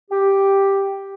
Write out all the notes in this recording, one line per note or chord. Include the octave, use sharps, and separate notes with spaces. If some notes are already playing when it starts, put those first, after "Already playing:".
G4